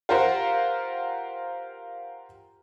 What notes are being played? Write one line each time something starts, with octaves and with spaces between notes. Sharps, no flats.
F4 G4 A#4 C5 F#5